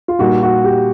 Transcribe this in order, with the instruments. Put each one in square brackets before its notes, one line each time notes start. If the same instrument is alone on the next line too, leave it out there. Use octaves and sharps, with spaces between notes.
[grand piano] F4
[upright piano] A#2 G3 A#3 D#4 [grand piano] F#4
[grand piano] F#4
G4